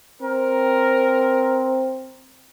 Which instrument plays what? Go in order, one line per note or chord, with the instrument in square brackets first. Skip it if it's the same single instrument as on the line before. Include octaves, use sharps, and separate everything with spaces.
[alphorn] C4 [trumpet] A#4